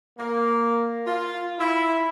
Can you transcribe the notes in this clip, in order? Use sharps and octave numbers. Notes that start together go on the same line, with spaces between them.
A#3
F4
E4